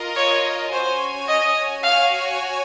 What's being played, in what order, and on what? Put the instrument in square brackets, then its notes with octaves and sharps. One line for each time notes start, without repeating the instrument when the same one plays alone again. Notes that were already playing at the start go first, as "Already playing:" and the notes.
Already playing: [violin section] F4 A#4 D#5
[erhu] C#5
[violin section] C#4 F#4 C#5 G#5 [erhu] C5
[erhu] D#5
[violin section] F#4 C#5 G#5 [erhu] F5